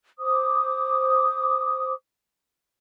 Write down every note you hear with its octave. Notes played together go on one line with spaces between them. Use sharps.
C5 D6 D#6